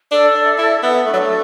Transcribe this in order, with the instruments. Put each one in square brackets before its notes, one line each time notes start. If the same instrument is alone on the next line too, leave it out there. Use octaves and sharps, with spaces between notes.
[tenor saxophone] D4 [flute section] A4
[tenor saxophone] D4
[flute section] E5
[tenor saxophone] E4
[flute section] A4
[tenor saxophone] B3
[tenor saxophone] A3 [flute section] D4
[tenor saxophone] F#3
A3